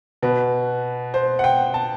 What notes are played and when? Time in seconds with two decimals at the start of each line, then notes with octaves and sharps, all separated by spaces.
0.23 B2 B4
1.14 C5
1.39 F#5
1.44 G5
1.74 A5